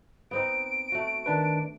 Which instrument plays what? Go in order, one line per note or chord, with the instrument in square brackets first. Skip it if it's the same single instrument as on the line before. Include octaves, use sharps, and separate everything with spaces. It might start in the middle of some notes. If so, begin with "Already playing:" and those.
[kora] B3 C4 D#4 [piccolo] D7
[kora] A3 F#4
[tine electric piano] D#3 D4 B4